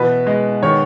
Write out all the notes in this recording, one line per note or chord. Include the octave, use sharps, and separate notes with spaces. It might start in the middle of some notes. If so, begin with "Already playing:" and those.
Already playing: B2 E3 B4
G#3
D#3 C#5